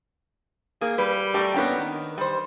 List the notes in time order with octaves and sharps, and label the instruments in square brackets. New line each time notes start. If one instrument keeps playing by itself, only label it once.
[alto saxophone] A#3 [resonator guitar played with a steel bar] G#4
[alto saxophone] G3 [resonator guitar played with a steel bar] B4
[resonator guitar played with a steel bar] A3 A#4 D5 [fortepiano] G4
[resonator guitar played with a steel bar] A#3 D4 A#4 [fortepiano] B3 C#4 G5
[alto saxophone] D#3
[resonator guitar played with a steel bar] G3 C5